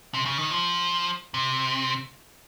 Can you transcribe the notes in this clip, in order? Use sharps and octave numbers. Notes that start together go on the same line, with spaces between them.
C3
C#3
D#3
F3
C3